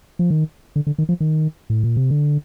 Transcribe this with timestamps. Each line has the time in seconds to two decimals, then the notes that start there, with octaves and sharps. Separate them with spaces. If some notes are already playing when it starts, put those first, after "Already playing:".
0.19 F3
0.30 D#3
0.76 D3
0.87 D3
0.98 D#3
1.09 F3
1.20 D#3
1.70 A2
1.84 A#2
1.97 C3
2.11 D3